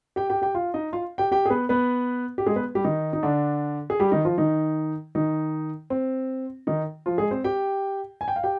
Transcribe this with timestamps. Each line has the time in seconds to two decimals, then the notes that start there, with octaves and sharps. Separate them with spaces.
0.16 G4 G5
0.30 G4 G5
0.42 G4 G5
0.55 F4 F5
0.74 D#4 D#5
0.93 F4 F5
1.18 G4 G5
1.32 G4 G5
1.46 G#4
1.50 B3 B4
1.69 B3 B4
2.38 G4
2.47 G#3 G#4
2.56 B3 B4
2.75 G3 G4
2.84 D#3 D#4
3.13 D#4
3.23 D3 D4
3.90 G#4
4.00 G3 G4
4.12 D#3 D#4
4.25 F3 F4
4.38 D#3 D#4
5.15 D#3 D#4
5.90 C4
6.67 D#3 D#4
7.06 F3 F4
7.18 G#3 G#4
7.31 C4 C5
7.44 G4 G5
8.21 G#5
8.28 G5
8.36 F5
8.44 G4 G5